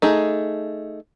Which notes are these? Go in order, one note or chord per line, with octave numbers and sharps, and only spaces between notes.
A3 D#4 G#4